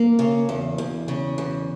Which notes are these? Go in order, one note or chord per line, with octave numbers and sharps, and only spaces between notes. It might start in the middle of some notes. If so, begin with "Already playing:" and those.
Already playing: A#3
C#3
E2
E2
C#3
E2